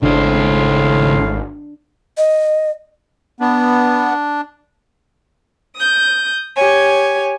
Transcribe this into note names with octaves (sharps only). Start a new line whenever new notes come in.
G#1 C#2 A2 G#3 D4 C5 F5
D#5
B3 D4
D#6 G6
G4 C#5 G#5